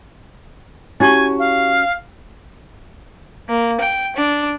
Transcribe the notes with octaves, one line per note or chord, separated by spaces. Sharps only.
C#4 E4 F#4 G4 G#5 C#6
F5
A#3
G5
D4